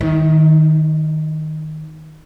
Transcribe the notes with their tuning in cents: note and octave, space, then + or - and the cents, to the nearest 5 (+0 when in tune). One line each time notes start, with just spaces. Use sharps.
D#3 +0 E4 -45